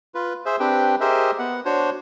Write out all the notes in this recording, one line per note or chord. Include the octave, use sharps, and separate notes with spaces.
F4 B4
G#4 C5 E5
C4 D4 G4 B4 G5
G4 G#4 A#4 C5 D#5 E5
B3 F#5
D4 F#4 C5 C#5